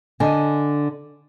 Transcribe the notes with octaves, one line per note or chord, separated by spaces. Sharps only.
D3 D#5 G#5